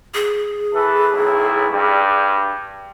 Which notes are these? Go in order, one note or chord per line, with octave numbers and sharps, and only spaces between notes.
G#4
E3 A4 B4
B1 A2 E4
G2 G3